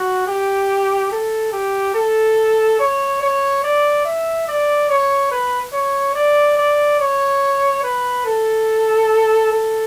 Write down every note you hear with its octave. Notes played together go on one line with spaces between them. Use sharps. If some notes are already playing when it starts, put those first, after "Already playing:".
Already playing: F#4
G4
A4
G4
A4
C#5
C#5
D5
E5
D5
C#5
B4
C#5
D5
D5
C#5
B4
A4
A4